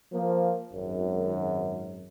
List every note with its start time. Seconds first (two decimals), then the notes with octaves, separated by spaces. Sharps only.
0.13 F3 A#3
0.73 G#1 F#2